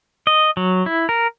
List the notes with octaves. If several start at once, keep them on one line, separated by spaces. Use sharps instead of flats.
D#5
F#3
E4
A#4